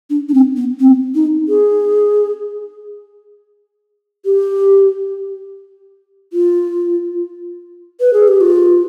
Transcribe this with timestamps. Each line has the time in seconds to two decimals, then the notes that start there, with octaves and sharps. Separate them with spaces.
0.10 D4
0.29 D4
0.34 C4
0.57 B3
0.80 C4
1.15 D#4
1.48 G#4
4.25 G4
6.33 F4
8.00 B4
8.14 G#4
8.28 G4
8.41 F4